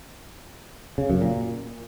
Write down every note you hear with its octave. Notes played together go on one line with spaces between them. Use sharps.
C#3
F#2
A#2